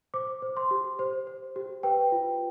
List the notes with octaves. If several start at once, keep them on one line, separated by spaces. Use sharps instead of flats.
C5 D6
C5
C6
G4
C5
C5
G4
B4 G5
F4